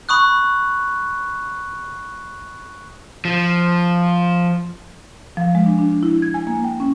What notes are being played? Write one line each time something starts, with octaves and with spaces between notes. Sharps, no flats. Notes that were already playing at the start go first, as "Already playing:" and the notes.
B5 C#6 D#6 F#6
F3
F3
G#3
D4
D4
E4
G#6
G#5
A#3
G5
C#4